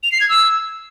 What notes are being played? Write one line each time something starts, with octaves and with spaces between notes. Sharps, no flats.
F7
C7
G#6
E6